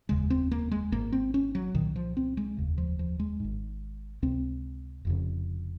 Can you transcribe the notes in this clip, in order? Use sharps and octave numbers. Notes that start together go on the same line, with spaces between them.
F1 D#2 C#3 G#3
C4
A#3
G#3
G#1 G#2 A#3
C4
C#4
F#3
C2 A#2 D#3
F3
C4
G#3
F1 D#2 C#3
F3
F3
G#3
G#1 G#2
C#2 C3 C4
F1 F2 C#3